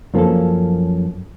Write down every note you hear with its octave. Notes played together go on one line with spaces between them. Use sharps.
F#2 F3 A#3 C#4 A4